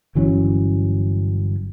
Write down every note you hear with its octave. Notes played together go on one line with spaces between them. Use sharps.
G1 E3 F#3 C#4